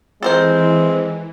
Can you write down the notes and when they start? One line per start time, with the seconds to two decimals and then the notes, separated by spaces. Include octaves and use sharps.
0.23 E3 G#3 C4 A4 A#4 C5